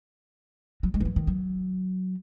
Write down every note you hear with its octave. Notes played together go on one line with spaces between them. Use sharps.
F#3
G#3
E3
F#3
D#3
F#3